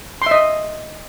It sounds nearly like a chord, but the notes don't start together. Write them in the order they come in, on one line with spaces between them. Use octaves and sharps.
C6 E5 D#5